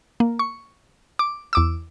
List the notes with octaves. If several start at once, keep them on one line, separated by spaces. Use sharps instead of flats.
A#3
C#6
D6
E2 D6 E6